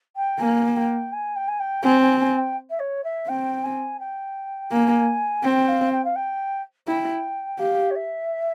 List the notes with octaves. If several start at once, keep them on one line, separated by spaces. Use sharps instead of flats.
G5
A#3 G#5
G5
G#5
G5
G#5
G5
C4 G#5
G#5
G#5
G5
E5
C#5
E5
C4 G5
G#5
G5
A#3 G#5
C4 G5
F5
G5
F5
G5
E4 G5
G4 F5
C#5
E5